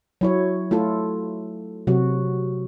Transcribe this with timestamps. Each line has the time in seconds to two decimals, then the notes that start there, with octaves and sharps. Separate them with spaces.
0.21 F#3 E4 C#5
0.71 A3 E4 F4 A4
1.87 C3 F#3 F#4